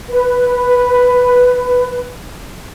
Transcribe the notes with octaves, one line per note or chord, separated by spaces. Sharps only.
B4